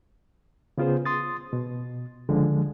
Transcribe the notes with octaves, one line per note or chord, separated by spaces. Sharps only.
C#3 B3 F4 G#4 C5
C6 D#6 A6
B2
C#2 D3 F3 G#3